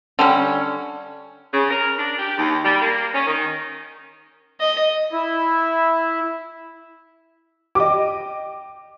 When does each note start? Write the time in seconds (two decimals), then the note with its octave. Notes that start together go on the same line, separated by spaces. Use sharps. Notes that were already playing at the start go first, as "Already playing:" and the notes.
0.19 D3 G3 C#4
1.53 C#3
1.70 A#4
1.98 D4
2.18 G4
2.38 D#2
2.64 G3
2.81 A#3
3.14 C#4
3.27 D#3
4.60 D#5
5.13 E4
7.75 G4 D#5 D6